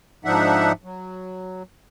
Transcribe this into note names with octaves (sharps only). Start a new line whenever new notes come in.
G#2 F3 D4 D#4 E5 F#5
F#3